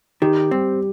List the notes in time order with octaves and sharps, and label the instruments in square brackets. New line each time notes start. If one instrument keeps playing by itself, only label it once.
[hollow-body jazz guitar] D#3 [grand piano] G4
[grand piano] G3 [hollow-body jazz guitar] C4